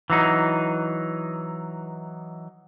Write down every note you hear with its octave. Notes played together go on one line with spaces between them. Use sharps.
E3 F#3 D#4